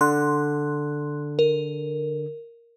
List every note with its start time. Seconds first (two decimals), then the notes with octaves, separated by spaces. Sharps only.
0.01 D3 C6 F#6
1.39 A#4